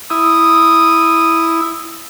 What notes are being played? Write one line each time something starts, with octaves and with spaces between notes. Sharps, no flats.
E4 D#6